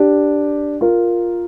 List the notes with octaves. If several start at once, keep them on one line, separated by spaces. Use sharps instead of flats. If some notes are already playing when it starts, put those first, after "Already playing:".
Already playing: D4 G4
F4 A#4